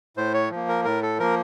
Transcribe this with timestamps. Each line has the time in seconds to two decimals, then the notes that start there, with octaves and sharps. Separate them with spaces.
0.17 A2 C5
0.34 C#5
0.51 F3 A#3
0.69 A#4
0.85 A2 A#4
1.02 A4
1.19 F3 A#3 A#4